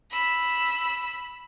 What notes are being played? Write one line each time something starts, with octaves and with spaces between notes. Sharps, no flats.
B5 E6